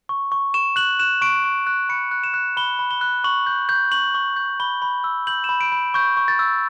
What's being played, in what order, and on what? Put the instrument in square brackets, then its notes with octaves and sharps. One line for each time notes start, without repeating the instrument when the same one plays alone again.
[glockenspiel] C#6
C#6
C#6 E7
F#6 F#7
F#6 E7
C#6 D7
C#6
F#6
B5 C#7
F#6
E7
F#6
B5 G7
B5
G7
F#6
C#6 F#7
G6
G6
C#6 F#7
C#6
G6
B5 G7
B5
E6
G6 F#7
E7
B5
D7
B5
C#6 G6
C#6
A6
E6